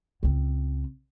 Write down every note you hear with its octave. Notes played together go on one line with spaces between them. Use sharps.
C#2 C4